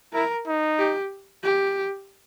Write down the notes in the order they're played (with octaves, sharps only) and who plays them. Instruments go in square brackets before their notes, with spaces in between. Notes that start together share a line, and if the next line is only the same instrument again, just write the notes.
[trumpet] E4 [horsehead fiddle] A#4
[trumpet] D#4
[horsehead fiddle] G4
G4